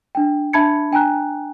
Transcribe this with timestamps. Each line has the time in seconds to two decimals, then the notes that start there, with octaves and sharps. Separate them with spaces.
0.15 D4 G5
0.53 D4 E5 A5 B5 G#6 C#7
0.91 D4 G5 G#5 A#5 F#6